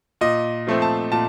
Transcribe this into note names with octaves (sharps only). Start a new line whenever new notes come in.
A#2 D#5
F3 A3 C4
A5
A#2 A5